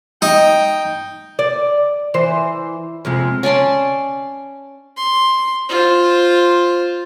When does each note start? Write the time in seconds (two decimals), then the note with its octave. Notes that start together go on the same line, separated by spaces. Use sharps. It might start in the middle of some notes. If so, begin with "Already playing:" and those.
0.22 D#4 G5
1.39 D5
2.14 E3 C5
3.05 F2 C3 G#3
3.43 C#4 D5 A5 C6
4.97 C6
5.69 F4 C5